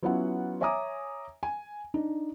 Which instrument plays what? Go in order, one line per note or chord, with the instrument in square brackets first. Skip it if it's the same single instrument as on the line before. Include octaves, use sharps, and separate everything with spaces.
[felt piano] F#3 B3 C#4 E4 F4 F#5
C#5 E5 G#5 A#5 D6 D#6
G#5
D4 D#4